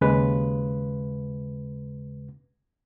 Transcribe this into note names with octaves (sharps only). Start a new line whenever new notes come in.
D#2 C#3 G#3 B4